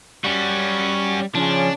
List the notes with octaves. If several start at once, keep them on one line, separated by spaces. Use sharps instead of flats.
G3 C#4 F#4
C#3 F3 C#4 D4